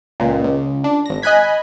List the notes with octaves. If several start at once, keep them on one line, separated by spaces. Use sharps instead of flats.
C#2 A#2
C#2
D4
G#1 A#6
D#5 G#5 B5 F#6 G#6 B6